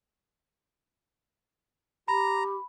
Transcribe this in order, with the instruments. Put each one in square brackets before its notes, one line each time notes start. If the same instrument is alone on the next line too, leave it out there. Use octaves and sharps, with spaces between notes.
[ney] G4 [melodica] A#5 [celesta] B5